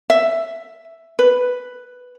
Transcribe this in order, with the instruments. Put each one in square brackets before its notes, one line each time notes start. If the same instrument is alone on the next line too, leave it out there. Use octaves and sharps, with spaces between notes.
[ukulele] E5
B4